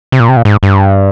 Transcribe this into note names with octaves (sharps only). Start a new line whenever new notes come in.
C3
A#2
C3
A#2
G#2
G2